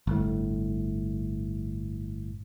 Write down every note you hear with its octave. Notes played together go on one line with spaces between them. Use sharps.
G1 A2